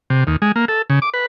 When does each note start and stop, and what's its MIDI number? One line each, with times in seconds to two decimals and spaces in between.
0.10 0.24 48
0.27 0.36 39
0.42 0.52 56
0.56 0.65 58
0.68 0.82 69
0.90 0.99 49
1.02 1.10 86
1.14 1.26 71